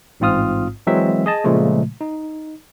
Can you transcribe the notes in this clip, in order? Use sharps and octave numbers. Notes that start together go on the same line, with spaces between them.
A1 G#2 C4 F4 D#6 F6
E3 F#3 G#3 C4 E5
G#4 D#5 A5
A#2 C#3 F3 G#3 A3
D#4